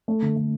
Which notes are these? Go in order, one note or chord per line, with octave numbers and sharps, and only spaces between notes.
A3
D3
A3